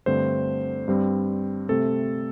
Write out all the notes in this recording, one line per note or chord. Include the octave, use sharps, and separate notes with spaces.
G2 D3 A3 C4 C5
G2 G3 C4
C3 A3 C4 A4